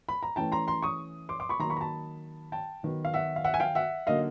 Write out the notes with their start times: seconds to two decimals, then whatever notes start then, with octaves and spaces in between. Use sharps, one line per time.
0.09 B5
0.23 A#5
0.36 E3 A3 C#4 G5 A5
0.52 A#5 C6
0.67 A#5 C6
0.82 C#6 D#6
1.29 C6 D6
1.40 C6 D6
1.49 B5 C#6
1.59 D#3 F#3 A#3 A#5 C6
1.70 B5 C#6
1.77 A#5
1.81 A5 B5
2.52 G5 A5
2.83 D#3 F#3 B3
3.05 F5
3.14 E5 F#5
3.36 F5
3.44 E5 F#5
3.54 G#5
3.60 F5 G5
3.75 E5 F#5
4.07 D3 F#3 A#3 D#4 D#5 F5